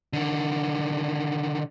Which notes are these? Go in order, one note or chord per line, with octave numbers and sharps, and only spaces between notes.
D3 D#3